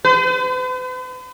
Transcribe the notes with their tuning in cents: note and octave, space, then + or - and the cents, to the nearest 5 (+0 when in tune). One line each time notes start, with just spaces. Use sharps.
B4 +45